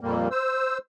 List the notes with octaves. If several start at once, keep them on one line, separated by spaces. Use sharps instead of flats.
F2 A#2 G3 A#3
C5 E6